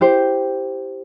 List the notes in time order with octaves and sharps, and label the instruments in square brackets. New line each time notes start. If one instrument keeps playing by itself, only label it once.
[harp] E4 G4 C5